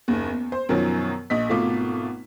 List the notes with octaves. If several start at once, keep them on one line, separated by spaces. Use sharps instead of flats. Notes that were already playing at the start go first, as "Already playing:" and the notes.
F#1 D#2
E2
C5
F#2 B2 D#3 F3 F#3
A#1 D#5 B6
G#1 B2 A3 F4 D6